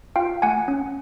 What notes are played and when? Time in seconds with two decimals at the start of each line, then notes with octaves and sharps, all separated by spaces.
0.16 F4 F5 G5
0.42 A3 F#5 G#5
0.68 C#4